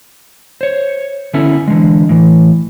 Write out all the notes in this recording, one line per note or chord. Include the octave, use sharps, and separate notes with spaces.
C5 C#5
D3 B3 C#4 E4 A4
D3 E3 G#3
A2 E3